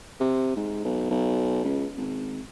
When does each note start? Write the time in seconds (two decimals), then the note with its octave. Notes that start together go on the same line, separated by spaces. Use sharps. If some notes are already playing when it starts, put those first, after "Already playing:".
0.20 C3
0.56 G#2
0.85 B1
1.10 B1
1.64 C#2
1.97 G#1